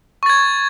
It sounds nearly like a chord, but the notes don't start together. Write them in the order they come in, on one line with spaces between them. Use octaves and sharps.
C#6 A6 G#6